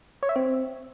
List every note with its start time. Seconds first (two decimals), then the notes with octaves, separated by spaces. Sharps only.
0.23 C#5
0.29 E5
0.36 C4